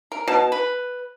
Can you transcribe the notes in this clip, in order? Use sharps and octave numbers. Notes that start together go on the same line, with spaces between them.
A#4
B2 A5
B4